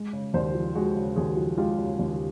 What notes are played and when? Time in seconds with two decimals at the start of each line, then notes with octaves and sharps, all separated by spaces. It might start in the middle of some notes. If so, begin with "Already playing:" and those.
Already playing: G#3
0.13 C#3
0.34 D#2 C5 D5
0.55 F3
0.75 G#3 F#4 G#4
0.96 C#3
1.16 D#2 F#4 G#4
1.37 F3
1.57 G#3 F4 G4
1.78 C#3
1.99 D#2